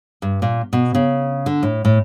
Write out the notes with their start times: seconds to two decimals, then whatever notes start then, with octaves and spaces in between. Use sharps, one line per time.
0.22 G2
0.42 A#2
0.73 B2
0.94 C#3
1.46 D3
1.63 A2
1.85 A2